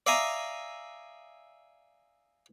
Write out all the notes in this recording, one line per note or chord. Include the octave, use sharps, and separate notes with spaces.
D5 E5 F5 G#5 A#5 D#6